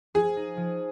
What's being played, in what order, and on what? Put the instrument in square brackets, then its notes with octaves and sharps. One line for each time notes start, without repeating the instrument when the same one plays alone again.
[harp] F3 [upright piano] G#4
[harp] D#4
F3